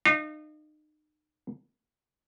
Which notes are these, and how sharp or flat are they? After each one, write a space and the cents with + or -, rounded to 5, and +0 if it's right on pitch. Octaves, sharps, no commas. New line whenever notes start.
D#4 -35 F5 -35